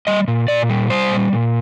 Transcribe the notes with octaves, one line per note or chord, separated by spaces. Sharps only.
G3 D#5
A#2
A#2 D5
G3
G3 C5
A#2
A#2